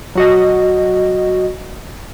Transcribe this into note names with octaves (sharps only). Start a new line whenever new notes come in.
F#3 F#4 D#5